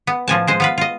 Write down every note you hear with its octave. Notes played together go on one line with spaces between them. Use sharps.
B3
A2 F3 G#5 A5
G#3 C5 D#5
B3 F4 B4
F4 D#5